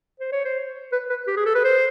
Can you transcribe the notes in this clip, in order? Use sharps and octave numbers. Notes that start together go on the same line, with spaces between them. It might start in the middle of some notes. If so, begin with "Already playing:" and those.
C5
C#5
C5
B4
B4
G4
G#4
A4
B4
C5